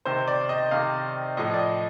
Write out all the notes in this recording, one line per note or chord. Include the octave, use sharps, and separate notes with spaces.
C3 D#3 C5
D5
D#5
C3 D#3 F5
A2 F3 D#5
D5
D#5